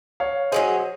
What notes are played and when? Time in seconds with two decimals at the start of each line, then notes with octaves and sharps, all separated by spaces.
0.20 C#5 F5
0.52 F#3 C#4 G#4 C5 D#5